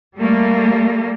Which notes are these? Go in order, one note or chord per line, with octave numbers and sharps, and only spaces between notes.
G3 A3 A#3